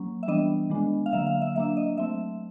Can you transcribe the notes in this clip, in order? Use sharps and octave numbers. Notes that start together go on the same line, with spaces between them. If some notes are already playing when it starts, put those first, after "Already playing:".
Already playing: F#3 A#3 C#4
E5
E3 G3 B3 D4 D#5
D#3 G#3 B3 D4
F5
D3 F#3 A#3 E5
F5
E5
F#3 A#3 D4 E5
D#5
F#3 A3 C4 E5